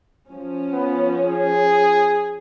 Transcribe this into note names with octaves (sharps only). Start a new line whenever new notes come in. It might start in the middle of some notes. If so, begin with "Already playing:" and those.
F3 C#4
B3
G#4